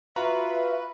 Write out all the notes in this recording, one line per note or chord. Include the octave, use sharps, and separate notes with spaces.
F4 F#4 B4 E5 A#5